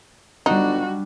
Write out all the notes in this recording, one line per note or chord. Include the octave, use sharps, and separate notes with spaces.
G1 G3 D4 D#4 F#4